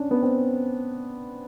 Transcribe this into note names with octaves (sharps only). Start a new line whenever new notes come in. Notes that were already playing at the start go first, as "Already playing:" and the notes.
Already playing: C#4 D4
B3
C4